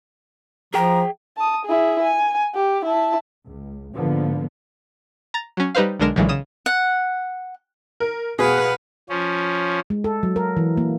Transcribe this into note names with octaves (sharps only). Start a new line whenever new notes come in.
F3 G#4 G5 A#5
A5 D#6
E4 G#4
G#5
G4
E4 A5
C#2
G#2 D3 F3 A#3 B3
A#5 A6
F#3 C#4
G3 D#4 B4 C5 F5
B1 D3 G#3 D4 A#4 E7
B1 A#2 D3 E3 F#3 G#3
C#3 D#6 E7
F#5
A#4
B2 F#4 G#4 B4 F5 F#5
F3 C#4
G#3
A4
F#3
A#4
E3
A#3